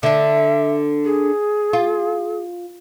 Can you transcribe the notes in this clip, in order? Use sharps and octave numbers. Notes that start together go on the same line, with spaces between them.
D3 D4 E5
G#4
F4